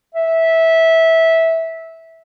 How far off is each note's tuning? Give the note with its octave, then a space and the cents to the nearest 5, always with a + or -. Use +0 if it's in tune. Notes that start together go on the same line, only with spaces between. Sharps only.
E5 -15